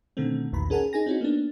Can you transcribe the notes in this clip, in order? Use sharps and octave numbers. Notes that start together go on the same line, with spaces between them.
B2 D3 D#3 A3 C4
B1 E2 A#2 D#3 A#5 B5
C#4 G#4 A#4 F#5 G#5 A5
D#4 G#4 G#5 A#6
C4 C#4 D#4 E4 F#4
A#3 B3 D4